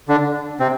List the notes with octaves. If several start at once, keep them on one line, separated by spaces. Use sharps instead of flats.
D3 D4
C3 C4